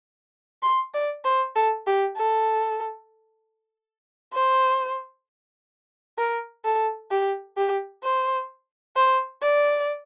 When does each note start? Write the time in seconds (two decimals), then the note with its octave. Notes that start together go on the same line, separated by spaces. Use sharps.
0.63 C6
0.94 D5
1.25 C5
1.55 A4
1.87 G4
2.17 A4
4.33 C5
6.18 A#4
6.65 A4
7.11 G4
7.57 G4
8.04 C5
8.96 C5
9.42 D5